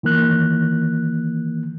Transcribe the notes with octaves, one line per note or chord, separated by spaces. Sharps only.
D#3 E3 A#3 F#6